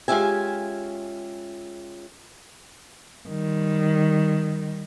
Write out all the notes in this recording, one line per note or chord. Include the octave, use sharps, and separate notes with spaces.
G#3 C#4 F4 G4 E5 G#5
D#3 G3